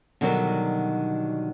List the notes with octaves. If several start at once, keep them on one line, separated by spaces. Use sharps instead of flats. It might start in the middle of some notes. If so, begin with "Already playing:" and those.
B2 D3 D#3 F#3 G3